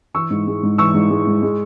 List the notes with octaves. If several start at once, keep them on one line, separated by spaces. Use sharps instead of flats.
E3 C#6 E6
G#2
G#3
G#2
E3 C#6 E6
G#2
G#3
G#2
G#3